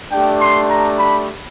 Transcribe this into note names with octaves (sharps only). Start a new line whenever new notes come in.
A3 D4 G4 G5
C6
A#5
B5